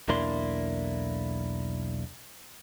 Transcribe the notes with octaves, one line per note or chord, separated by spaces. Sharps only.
B1 E2 A#3 D4 E4 C6